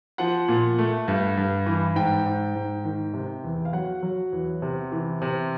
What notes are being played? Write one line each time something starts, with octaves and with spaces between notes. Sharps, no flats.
F3 F#5
A#2
A3
G2
G2
E3
G#2 G5
G#2
G#2
D#3
C3
E2
F5
F#3 F#5
F#3
E2
C3
E3
C3